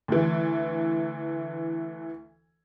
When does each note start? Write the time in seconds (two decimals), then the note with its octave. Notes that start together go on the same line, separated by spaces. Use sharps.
0.08 D2 E3